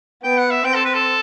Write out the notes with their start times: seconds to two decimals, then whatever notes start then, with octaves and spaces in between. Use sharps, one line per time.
0.23 B3 G5
0.37 F#5
0.51 E5
0.64 C4 G5
0.75 A4
0.85 B4
0.95 A4